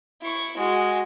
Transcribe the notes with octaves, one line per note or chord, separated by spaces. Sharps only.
E4 C#6
G#3 F#4